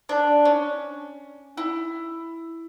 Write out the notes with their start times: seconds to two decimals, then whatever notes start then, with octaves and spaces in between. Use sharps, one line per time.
0.09 D4
0.45 C#4
1.57 E4